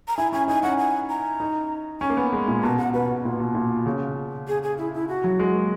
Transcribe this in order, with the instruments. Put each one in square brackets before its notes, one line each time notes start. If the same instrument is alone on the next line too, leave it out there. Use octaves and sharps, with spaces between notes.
[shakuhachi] A#5
[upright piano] E4 [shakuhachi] G#5
[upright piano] C#4 [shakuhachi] G#5
[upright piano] D#4 [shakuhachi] G#5
[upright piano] C#4 [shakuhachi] F#5
[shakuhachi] G#5
A#5
[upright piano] D#4
[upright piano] C#4 [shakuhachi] G#5
[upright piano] A#3
B3
G#3
A#2
[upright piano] B2 [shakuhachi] A#5
[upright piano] B2 [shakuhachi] F#5
[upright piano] B2 [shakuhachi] B4
[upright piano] B2
A#2
B2
A#2
C#3
[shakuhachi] G#4
G#4
E4
E4
F#4
[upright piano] F#3
G#3
A#3